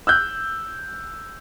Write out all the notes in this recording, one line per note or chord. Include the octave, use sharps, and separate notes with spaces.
E6 F#6 G6